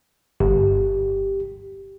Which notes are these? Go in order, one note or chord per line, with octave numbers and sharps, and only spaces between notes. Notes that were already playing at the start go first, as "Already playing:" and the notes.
G1 G4